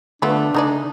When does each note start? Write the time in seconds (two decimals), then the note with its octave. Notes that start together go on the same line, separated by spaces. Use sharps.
0.22 D3 A3 B3 D4 F4 B4
0.54 C#3 A3 D#4 A#4 D5 G#5